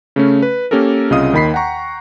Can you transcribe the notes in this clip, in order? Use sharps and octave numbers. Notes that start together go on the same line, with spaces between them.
C#3 A3 C#4
B4
A#3 C#4 G4 A4 A#4
C2 C#3 F4 D#5 F5 D#6
D#2 D#3 D#5 B5 B6 C7
F#5 G5 A#5 C#6